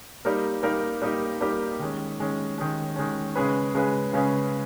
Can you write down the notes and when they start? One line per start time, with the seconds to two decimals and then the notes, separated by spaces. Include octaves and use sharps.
0.25 G3 A#3 D#4 G4 A#4
0.63 G3 A#3 D#4 G4 A#4
1.02 G3 A#3 D#4 G4 A#4
1.41 G3 A#3 D#4 G4 A#4
1.79 D#3 G#3 C#4
2.19 D#3 G#3 C#4
2.58 D#3 G#3 C#4
2.96 D#3 G#3 C#4
3.35 C#3 G#3 C#4 G#4 B4
3.75 C#3 G#3 C#4 G#4 B4
4.13 C#3 G#3 C#4 G#4 B4